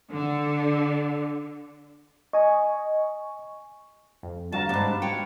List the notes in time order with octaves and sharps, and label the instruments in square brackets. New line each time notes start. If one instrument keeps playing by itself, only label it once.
[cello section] D3
[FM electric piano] D#5 [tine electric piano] G#5 C#6
[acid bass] F2
[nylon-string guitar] D2 [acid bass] G3 [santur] F#4 F5 A#5 [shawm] A5
[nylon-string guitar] F2 G#2 [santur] D4 B4
[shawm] C#5 [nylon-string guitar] G5